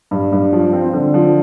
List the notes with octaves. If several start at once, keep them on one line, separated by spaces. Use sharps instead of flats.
G2
G2
F3
C4
D3
F3